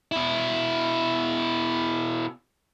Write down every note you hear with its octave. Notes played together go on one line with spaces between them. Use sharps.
B2 E4